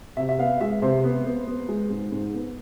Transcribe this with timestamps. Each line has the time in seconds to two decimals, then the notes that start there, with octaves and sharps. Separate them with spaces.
0.17 C3 E5
0.29 E5
0.39 B3 F5
0.61 G#3 E5
0.82 C3 C5
1.04 B3
1.26 B3
1.47 B3
1.69 G#3
1.90 G#2
2.12 G#2
2.34 B3